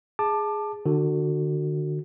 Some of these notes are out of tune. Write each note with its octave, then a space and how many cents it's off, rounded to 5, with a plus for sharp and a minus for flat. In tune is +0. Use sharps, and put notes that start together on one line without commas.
G#4 +0 A5 +0 D6 +25
D3 +30 F#4 +0